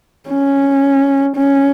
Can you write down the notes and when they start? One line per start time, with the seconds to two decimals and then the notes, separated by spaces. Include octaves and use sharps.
0.30 C#4
1.36 C#4